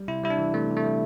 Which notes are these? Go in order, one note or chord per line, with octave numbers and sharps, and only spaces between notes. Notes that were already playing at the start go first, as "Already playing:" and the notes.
Already playing: G3
C3 E4
G3 E4
D4
E3
C3 A3
C3
A3
G3